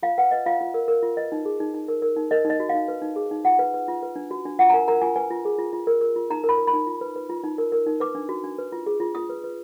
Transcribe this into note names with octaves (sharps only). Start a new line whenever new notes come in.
F4 F5
B4 F#5
B4 D#5
F4 F5
F4
A#4
A#4
F4
B4 D#5
D#4
G#4
D#4
D#4
A#4
A#4
D#4
A#4 D#5
D#4 D#5
F#4
D#4 F5
B4
D#4
G#4
D#4
F4 F#5
B4
B4
F4
B4
D4
F#4
D4
F4 F#5
A#5
A#4 G#5
A#4 A#5
F4 G#5
B4 G#5
F4
G#4
F4
F4
A#4
A#4
F4
D#4 A#5
A#4
B5
A#4
B5
D#4
F4
B4
B4
F4
D#4
A#4
A#4
D#4
B4 D6
D4
F#4
D4
B4
F4
G#4
F4
F4 D#6
B4
B4